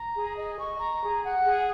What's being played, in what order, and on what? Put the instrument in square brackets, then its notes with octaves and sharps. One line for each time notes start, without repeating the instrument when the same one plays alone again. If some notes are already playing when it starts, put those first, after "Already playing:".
Already playing: [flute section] A#5
G#4
D#5
C#6
A#5
G#4
F#5
G#4